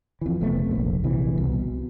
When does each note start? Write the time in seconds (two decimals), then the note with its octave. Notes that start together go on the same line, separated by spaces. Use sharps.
0.21 F2 E3
0.40 F1 C3 A3 B3
0.71 F1 A#1
1.04 A#1 C3 E3
1.38 C2
1.49 B2